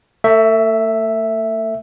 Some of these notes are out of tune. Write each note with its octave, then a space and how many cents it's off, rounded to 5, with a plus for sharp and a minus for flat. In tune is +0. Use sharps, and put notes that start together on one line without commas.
A3 +35 E5 +0